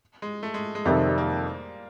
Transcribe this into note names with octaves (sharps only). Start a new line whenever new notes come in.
G#3
A3
G#3
G#3
F2 C3 D#3 G3
G#3
G3
A#3